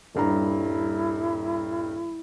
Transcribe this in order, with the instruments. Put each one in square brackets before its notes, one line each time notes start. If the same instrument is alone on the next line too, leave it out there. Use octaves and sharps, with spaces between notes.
[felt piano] D#1 G2 A#5 [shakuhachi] E4